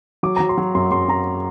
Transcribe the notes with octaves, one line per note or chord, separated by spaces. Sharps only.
F#3 D6
F#3 A#5
C6
F#3
F#2 C6
F#2 C6
F#3 A#5